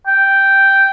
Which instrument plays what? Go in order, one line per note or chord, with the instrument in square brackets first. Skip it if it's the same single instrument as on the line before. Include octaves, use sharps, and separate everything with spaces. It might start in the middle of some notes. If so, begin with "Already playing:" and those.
[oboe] G5